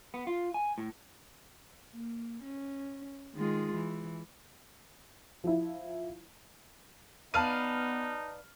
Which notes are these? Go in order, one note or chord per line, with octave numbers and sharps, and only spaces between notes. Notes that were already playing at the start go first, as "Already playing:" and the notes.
B3
F4
G#5
A2
A#3
C#4
D#3 G#3 F4
E3
F3 E4
B3 D#4 B4 D5 F5 A5 F6 D#7